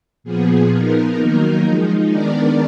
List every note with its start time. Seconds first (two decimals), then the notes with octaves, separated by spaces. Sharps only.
0.24 A#2 F3 B3 G#4
0.70 F3 B3 D#4 A#4
1.17 D#3 F#3 A#3 D#4
1.64 F3 G#3 D#4
2.10 D#3 G#3 B3 D4 A#4 D5